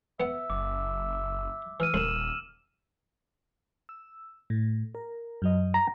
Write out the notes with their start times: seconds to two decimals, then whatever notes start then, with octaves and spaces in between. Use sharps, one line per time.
0.20 B3 E5 F#5
0.50 F#1 D6
1.80 E3 E6 F6 D#7
1.94 D#1 C2 C6 E7 F#7
3.89 E6
4.50 A2
4.95 A#4
5.42 F#2 F#3 D#5
5.74 A#5